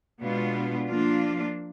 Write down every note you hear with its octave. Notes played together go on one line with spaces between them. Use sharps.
B2 G#3 B3 D4 F4
F3 A#3 D4 F4